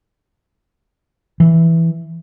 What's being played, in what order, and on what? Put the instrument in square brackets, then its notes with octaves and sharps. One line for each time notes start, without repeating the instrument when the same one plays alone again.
[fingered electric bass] E3